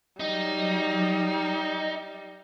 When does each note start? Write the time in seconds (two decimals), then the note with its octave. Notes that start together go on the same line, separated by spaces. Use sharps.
0.20 F#3 G3 D#4